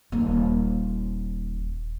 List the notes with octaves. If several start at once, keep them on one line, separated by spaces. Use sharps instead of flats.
D#1 A#3